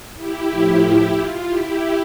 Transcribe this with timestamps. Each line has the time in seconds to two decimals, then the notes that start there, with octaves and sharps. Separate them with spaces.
0.16 E4 G4
0.50 A2 F3
1.16 F4
1.48 E4 G4